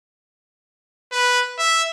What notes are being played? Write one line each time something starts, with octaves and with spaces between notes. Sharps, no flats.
B4
E5